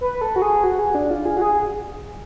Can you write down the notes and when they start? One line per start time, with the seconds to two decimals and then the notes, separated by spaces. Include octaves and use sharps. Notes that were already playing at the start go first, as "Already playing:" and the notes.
0.01 B4
0.21 A4
0.36 F#4
0.42 G#4
0.64 F#4
0.79 G#4
0.95 D4
1.11 F4
1.25 G#4
1.37 F#4
1.41 G#4